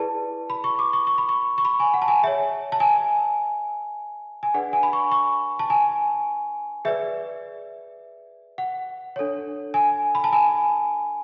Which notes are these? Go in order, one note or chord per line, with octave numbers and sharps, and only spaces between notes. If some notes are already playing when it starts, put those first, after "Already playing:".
Already playing: E4 G#4 B4 D5 A5
B5
C#6
D6
C#6
C#6
B5
C#6
C#6
B5
G#5
F#5
A5
G#5
G#4 C#5 E5
A5
G#5
G#5
D4 G#4 B4 D5 F#5
G#5
B5
C#6
C#6
A5
G#5
G#4 B4 D5 E5
F#5
D4 A4 C#5
G#5
B5
A5
G#5